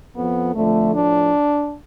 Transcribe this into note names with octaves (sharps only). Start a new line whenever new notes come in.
F2 F3 B3
F2 D3 F3 A3
A2 F3 D4